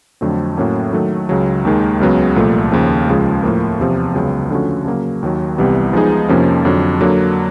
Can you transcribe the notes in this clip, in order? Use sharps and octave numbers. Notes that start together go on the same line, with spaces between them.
F2 D3 F#3 A3 C4
A2 F#3 A#3 C#4
D#3 F#3 A3
C#2 C#3 F#3
D#2 D#3 G#3
C#2 C#3 F#3 B3
C2 A#2 F3 A3
D#2 C#3 F3
C#2 C#3 F3 G#3
A2 F3 A#3
E2 C3 F3
C#2 C#3 F#3 B3
D3 F3 A3 C#4 F#4
C#3 F#3 A#3
D#2 D#3 F#3
C2 C3 E3 G3 B3
F3 G#3 B3 D#4 G#4
F2 C3 F3 A#3 C#4
F2 D3 F#3
D3 F#3 A#3